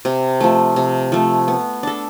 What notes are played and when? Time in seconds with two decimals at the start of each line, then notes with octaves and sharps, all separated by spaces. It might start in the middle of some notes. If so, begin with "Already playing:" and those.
0.05 C3
0.41 F3 A3
0.76 C3
1.12 F3 A3
1.48 B3
1.83 D4 A4